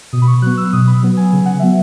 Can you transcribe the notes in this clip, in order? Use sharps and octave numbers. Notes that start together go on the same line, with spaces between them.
B2 D#6
B5
C#6
F#3 B3 F#6
E6
B2 D#6
B5
F#3 B3
G#5
C#3 G#5
F#5
F#3 B3 E5